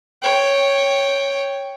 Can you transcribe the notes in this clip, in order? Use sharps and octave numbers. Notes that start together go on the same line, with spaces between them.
C#5 G5